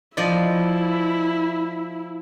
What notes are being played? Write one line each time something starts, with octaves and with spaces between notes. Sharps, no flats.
F3 E4 D5 D#5